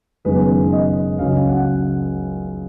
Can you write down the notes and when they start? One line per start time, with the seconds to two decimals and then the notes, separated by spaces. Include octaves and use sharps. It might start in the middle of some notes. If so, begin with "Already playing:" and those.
0.25 F#1 F#2 D#3 G#3 B3 B4
0.72 D#5
1.19 C#2 C#3 F#3 F5
1.49 F#5